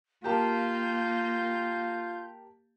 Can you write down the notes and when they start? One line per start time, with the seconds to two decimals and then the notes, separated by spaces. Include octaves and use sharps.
0.24 A#3 F4 G4 A#4 A5 G6